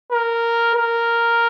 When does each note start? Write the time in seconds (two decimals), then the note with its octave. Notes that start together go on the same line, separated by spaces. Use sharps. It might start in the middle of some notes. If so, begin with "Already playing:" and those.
0.12 A#4
0.75 A#4